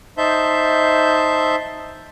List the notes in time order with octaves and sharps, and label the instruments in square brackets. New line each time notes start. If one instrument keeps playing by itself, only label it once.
[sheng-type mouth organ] D#4 C5 E5 A5 G6